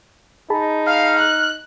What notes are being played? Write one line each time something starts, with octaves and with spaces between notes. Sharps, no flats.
D#4 G#4 A5 B5
F5 F6
F#6